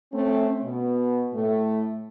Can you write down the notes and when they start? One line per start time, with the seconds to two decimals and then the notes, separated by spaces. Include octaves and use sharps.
0.13 A3 C4 C#4
0.64 B2
1.33 A2 A3